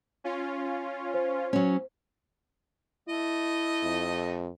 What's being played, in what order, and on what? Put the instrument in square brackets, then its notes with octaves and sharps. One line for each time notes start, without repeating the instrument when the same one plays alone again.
[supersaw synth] C#4 F4
[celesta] C5
[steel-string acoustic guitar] F#3 C#4
[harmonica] A3 D#5 [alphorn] E4
[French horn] F2